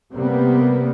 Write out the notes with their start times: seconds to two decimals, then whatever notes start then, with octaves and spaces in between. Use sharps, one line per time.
0.12 C3 G3 A#3 B3